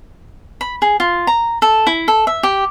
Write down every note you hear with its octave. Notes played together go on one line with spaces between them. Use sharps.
B5
G#4
F4
A#5
A4
E4
A4
E5
G4